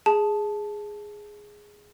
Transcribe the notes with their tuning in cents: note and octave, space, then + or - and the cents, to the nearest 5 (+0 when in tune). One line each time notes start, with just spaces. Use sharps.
G#4 +0 A5 -10